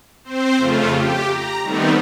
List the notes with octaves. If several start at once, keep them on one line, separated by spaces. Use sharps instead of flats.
C4 C5
F2 C#3 A3 F4
G4
A#5
D#3 G3 A3 B3 C4